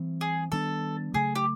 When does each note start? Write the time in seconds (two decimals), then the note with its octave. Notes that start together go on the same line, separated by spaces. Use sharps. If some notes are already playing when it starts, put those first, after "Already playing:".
Already playing: E3 G3 C4
0.21 G#4
0.52 D#3 G3 B3 D4 A4
1.14 C#3 F#3 A3 G#4
1.35 G4